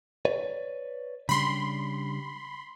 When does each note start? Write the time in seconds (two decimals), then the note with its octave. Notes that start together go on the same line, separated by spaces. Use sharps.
0.25 B4 C#5 D5
1.29 C#3 G3 D4 B5 C6